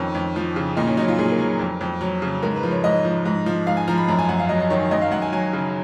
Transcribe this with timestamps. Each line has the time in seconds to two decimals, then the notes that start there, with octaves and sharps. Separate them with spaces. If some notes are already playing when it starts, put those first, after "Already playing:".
Already playing: F2 D#3 C#4
0.15 F2
0.36 F3
0.56 C#3
0.77 A#2 D#4
0.87 C#4
0.97 F#3 D#4
1.08 F4
1.19 A#2 G#4
1.31 A#4
1.39 F#3
1.59 F2
1.81 F2
2.01 F#3
2.22 C#3
2.43 G#2 A#4
2.56 B4
2.63 F3
2.71 C#5
2.84 G#2 D#5
3.05 F3
3.25 G#2
3.46 F3
3.67 G#2 F5
3.77 G#5
3.87 F3 A#5
3.98 B5
4.08 F#2 A#5
4.19 G#5
4.29 F#2 F#5
4.40 F5
4.49 F#3 D#5
4.60 D#5
4.70 D#3 C#5
4.91 F#2 D#5
5.02 F5
5.11 F#2 F#5
5.22 G#5
5.32 F#3 G#5
5.53 C#3